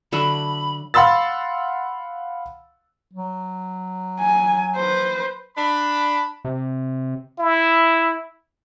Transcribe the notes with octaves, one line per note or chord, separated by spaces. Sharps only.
D3 F#3 E5 B5
F5 F#5 B5 C6 E6 A6
F#3
G#5
B4 C5
D4 B5
C3
E4